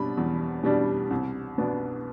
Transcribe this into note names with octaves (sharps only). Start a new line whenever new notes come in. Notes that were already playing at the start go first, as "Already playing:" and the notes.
Already playing: B2 G3 D4 B5
E2
B2 G3 D4
C2
B2 B3 D4